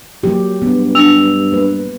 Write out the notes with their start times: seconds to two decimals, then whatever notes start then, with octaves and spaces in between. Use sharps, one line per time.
0.23 F#3 A#3 G4
0.62 G2 B3
0.95 D4 E6 F7
1.52 A#3 B4